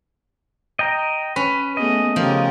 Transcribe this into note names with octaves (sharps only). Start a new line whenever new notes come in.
D#5 G5 A#5
C#4 B4
A3 B3 G#4 D#5
C#3 F3 G4 A#4